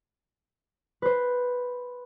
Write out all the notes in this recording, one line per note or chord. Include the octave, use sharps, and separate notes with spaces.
B4 C5